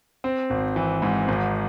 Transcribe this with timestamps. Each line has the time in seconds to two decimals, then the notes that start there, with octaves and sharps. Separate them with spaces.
0.24 C4
0.50 G#1
0.76 E3
1.02 G#2
1.28 G#1